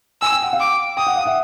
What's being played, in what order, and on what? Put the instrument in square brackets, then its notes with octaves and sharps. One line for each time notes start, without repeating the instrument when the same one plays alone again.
[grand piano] G#5 [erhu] E6
[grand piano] G5
F#5
F5 G5
[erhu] D6
[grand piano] G5 [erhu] D#6
[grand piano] F#5
F5
E5 F#5